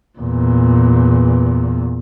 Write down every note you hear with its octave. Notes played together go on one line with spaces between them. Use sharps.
E2 A#2